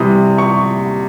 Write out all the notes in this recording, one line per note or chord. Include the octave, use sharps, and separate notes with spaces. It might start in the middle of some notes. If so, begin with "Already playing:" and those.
Already playing: C3 E3 G3 D#6
C#6